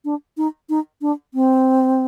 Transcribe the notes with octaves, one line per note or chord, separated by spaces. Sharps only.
D4
D#4
D#4
D4
C4